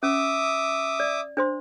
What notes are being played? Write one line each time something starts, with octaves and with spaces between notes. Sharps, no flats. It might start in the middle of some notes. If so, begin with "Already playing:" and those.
C#4 E5 D6 D#6
D5
D4 C5 C6